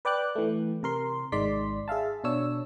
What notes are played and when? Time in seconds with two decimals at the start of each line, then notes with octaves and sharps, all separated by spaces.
0.05 B4 D5 G5 D6 F#6
0.35 E3 A3
0.83 C3 A#4 C6
1.32 G#1 G#3 D#4 D5 C6 B6
1.88 G#4 E5 F5 A5
2.24 B2 D4 C#5 E6